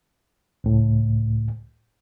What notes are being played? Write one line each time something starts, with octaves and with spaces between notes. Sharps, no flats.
C#2 A2